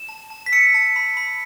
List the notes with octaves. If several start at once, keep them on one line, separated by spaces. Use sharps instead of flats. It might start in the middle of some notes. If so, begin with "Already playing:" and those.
Already playing: E7
A5
A5
B6
E6 C#7
A5
B5
B5